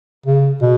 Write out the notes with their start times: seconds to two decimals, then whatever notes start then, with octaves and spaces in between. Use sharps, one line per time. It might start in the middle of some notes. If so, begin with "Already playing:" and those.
0.26 C#3
0.62 B2